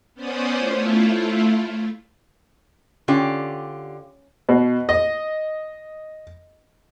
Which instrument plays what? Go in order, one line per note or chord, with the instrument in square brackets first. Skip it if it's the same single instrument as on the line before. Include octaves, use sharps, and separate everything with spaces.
[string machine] B3 C#4 C5 D5 D#6
A3 E4 F4
[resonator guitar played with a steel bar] D3 F4 G4 [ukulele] C#4
[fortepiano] B2
D#5